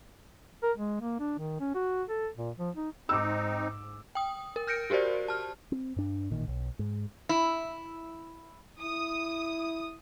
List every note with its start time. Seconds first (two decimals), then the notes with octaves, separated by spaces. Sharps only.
0.63 A#4
0.77 G#3
1.01 A#3
1.20 D4
1.38 D#3
1.60 C#4
1.75 F#4
2.09 A4
2.37 A#2
2.59 F3
2.76 D#4
3.09 G#2 C4 D#4 D6 E6
4.15 G5 D#6
4.56 A#4
4.67 F6 G6 A#6 C#7 D7
4.90 F#4 G4 A#4 C5 D5
5.28 A5 F6
5.72 C4
5.96 G2 D4
6.30 A1 A#2 D#3
6.48 B1
6.79 G#2
7.29 E4
8.80 E4 D#6